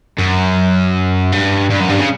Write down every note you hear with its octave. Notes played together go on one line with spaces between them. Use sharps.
F#2
G2
G2
F#2
G2
C#3